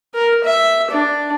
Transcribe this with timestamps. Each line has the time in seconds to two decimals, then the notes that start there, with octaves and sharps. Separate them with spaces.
0.14 A#4
0.44 E5
0.91 D4